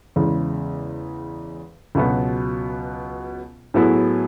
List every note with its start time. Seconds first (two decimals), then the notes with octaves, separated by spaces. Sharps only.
0.16 E2 C#3 G#3
1.95 C#2 B2 F#3 B3
3.74 A2 F#3 B3 E4 G#4